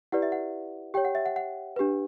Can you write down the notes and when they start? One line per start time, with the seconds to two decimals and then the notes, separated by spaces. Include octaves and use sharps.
0.12 E4 G4 B4 D5 F#5
0.22 E5
0.32 F#5
0.94 G4 C#5 G5
1.05 F#5
1.15 E5
1.26 F#5
1.36 F#5
1.76 D4 G4 B4